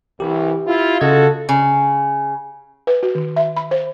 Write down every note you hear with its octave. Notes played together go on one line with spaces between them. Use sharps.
C2 E3 G4
E4 F4
C#3 F4 F#4 A4 D#5 G#6
C#3
B4
F#4
D#3
E5
B5
C5